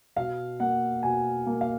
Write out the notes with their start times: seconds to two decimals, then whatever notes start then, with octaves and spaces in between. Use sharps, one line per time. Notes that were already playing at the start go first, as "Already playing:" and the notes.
0.16 B2 F5
0.60 A#3 F#5
1.03 B2 G#5
1.46 A#3
1.61 F5